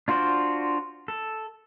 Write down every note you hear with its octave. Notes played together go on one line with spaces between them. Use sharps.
D4 F4 F#4 C5 D5
A4